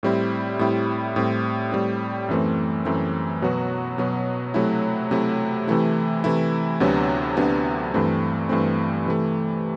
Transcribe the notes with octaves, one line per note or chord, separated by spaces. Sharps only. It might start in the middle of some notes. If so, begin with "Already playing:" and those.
A2 G3 C4 E4
A2 G3 C4 E4
A2 G3 C4
A2 G3 C4
F#2 E3 A3 C4
F#2 E3 A3 C4
B2 F#3 B3 F#4
B2 F#3 B3 F#4
C3 F#3 A3 E4
C3 F#3 A3 E4
C3 E3 A3 E4
C3 E3 A3 E4
D2 C3 F#3 B3 D4
D2 C3 F#3 B3 D4
G2 E3 A3 C4
G2 E3 A3 C4
C3 E3 A3